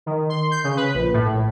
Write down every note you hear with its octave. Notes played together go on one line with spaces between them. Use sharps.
D#3
C6
G6
C#3
B4
A#1
A2